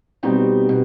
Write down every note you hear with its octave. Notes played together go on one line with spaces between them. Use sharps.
B2 G3 C4 D#4
B2